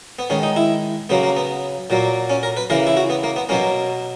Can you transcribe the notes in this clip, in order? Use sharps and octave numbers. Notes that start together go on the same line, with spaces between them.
B3
D#3 G#3 C#4
D#4
E4
C#3 F#3 A#3 B3
A#3
B3
A#2 F#3 A#3
C#4
A#4
B4
C#3 E3 A#3 A#4
E4
F#4
B3
A#3
B3
B2 F#3 A#3 C#4